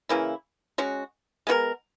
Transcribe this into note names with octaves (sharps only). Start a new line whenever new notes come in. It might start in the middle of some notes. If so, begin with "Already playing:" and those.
C#3 E3 A#3 E4
G#3 C#4 F#4
G#3 B3 F#4 A#4